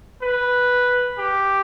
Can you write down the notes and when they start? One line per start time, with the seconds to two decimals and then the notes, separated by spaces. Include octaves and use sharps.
0.22 B4
1.18 G4